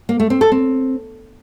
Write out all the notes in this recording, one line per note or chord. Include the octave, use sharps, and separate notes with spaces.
A#3
A3
C4
A4
C4